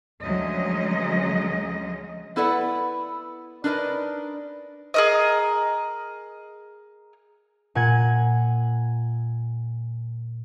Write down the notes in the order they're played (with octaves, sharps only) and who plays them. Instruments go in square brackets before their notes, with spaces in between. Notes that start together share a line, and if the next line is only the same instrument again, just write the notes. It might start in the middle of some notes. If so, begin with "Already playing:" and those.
[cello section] D2 F3 F#3 G#3 C#4 D#5
[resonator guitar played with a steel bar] B3 E4 A4 B4 D5 F#5
D4 D#4 A#4 B4 D5
[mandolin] G#4 A#4 D#5
[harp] A#2 F#5 G#5 G#6